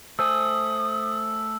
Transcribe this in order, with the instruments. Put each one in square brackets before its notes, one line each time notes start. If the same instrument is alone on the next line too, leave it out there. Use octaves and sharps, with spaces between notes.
[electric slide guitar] A3 C5 G#5 [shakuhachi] D#6 [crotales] E6